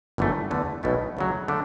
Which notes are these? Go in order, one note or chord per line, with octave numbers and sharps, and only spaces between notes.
G1 F#2 E3 A3
E2 D3 A3
B1 B2 A3 E4
D2 C#3 F#3
D3 A3 D4